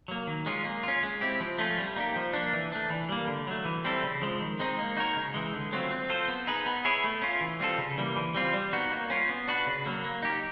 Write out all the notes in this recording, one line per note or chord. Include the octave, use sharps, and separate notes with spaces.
F#3 A#3
D#3
G#3 C#4 F4
A#3
C#4 F4
G#3
C4 E4 G4
F3
A3 C#4 F4
G3
A#3 D#4 G4
F3
A#3 D4
E3
A3 D4
E3
G3 A#3
D3
F#3 A3
E3
G3 C4 E4 A4
C#3
F3 G#3
D#3
G#3 C4 D#4
A#3
D#4 F#4 A#4 C#5
C#3
E3 G#3
D3
F#3 A3 C4 F4
C4
F4 A4 C5
B3
D#4 G#4 B4
B3
E4 G#4 C#5
A3
C#4 F4
E3
G3 C4 F4 A4
C#3
E3 G3 A#3
E3
G3 C4 F4
G3
B3 D#4 F#4
A#3
C#4 F4
B3
D4 F#4 B4
C#3
F#3 A#3
A#3
D#4 G4